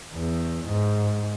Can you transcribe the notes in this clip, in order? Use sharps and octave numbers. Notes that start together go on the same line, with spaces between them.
E2
G#2